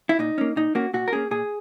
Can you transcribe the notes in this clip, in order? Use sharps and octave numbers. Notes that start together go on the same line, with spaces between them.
E4
A#2 D#4
A#3 C#4
A#2 D#4
A#3 C#4 F#4
A#2 F#4
A#4
A#3 C#4 G#4
A#2 G#4